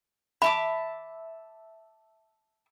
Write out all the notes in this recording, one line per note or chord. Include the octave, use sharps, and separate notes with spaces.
E5 A5 B5 D6